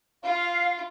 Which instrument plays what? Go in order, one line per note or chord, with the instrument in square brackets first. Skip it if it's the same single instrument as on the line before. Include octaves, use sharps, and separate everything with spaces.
[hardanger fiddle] F4 [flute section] F5